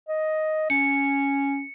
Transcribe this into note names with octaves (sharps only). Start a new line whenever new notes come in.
D#5
C#4 C#7